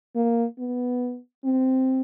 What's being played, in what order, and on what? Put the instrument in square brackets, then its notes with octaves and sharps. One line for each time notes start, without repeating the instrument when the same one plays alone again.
[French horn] A#3
B3
C4